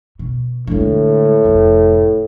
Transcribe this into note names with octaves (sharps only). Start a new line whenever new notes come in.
B2
A2 D3 G#3
F1 F2